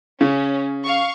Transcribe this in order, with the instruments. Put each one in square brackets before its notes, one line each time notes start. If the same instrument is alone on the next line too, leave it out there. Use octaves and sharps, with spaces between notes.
[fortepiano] C#3 [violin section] C#4
[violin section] F5 C#6